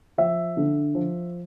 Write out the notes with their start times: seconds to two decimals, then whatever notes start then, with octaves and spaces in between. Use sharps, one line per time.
0.18 F3 E5
0.57 D3
0.95 F3